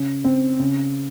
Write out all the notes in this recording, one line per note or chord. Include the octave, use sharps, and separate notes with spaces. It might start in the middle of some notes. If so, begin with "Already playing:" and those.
Already playing: C#3
C4
C#3